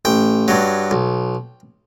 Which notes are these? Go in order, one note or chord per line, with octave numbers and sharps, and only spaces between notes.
A1 G5
G2 F#3
B1